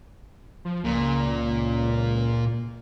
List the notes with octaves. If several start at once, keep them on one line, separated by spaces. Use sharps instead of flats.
F3
C#2 A#2